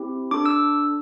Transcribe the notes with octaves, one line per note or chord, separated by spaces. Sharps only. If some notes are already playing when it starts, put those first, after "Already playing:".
Already playing: C4 E4 G4
D4 A4 D6
E6